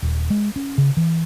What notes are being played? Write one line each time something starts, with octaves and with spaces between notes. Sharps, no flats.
D#1
G#3
C#4
C#3
E3